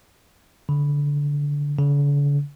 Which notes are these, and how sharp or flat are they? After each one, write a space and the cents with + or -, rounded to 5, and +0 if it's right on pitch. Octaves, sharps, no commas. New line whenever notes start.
D3 -20
D3 -45